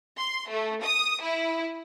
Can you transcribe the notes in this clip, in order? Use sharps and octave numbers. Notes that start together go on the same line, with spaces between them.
C6
A3
D#6
E4